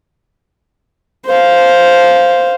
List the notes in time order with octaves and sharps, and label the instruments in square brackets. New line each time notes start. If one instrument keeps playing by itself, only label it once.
[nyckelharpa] C5 F5